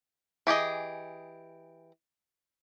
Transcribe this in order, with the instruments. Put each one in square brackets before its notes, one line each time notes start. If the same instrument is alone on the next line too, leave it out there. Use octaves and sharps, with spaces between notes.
[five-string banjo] E3 G4 G#4 D#5